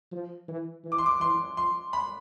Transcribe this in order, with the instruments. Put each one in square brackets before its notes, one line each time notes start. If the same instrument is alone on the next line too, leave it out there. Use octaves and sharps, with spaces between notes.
[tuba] F3
E3
E3
[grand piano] D6
C6
D6
[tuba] E3 [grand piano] C6
[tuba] F3 [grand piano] C6
[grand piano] B5